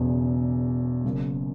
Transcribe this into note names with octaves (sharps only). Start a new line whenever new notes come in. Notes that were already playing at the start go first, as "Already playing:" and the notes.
Already playing: E1 E2 C#3
F#1 F#2 C#3